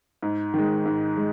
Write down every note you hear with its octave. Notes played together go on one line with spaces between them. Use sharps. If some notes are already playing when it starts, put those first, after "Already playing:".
G#2
D#3 G#3
G#2
G#3